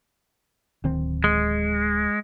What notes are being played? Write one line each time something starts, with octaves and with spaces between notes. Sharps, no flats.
D1 D#3 C4
G#3